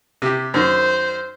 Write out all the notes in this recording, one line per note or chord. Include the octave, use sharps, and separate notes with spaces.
C3 G4
F#2 D#3 C5